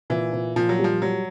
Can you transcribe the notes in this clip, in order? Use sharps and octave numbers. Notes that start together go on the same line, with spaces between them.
A#2 E3
A#2
A#2 F3
F#3
G3
F3
F#3 G3